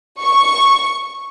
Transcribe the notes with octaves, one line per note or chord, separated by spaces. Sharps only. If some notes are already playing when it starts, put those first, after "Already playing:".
C#6